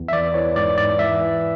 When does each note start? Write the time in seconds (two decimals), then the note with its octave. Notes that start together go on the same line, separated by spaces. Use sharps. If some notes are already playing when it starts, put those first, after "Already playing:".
Already playing: E2
0.08 E5
0.13 E3 D5
0.34 E3 C#5
0.56 G#2 D5
0.78 G#2 D5
0.99 E3 E5
1.21 E3